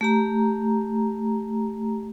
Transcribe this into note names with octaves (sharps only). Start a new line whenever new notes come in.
A3 G4 A#5